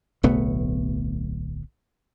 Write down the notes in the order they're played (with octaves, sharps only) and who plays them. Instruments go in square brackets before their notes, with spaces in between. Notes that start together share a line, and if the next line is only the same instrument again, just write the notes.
[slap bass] D1 B1 A3 B3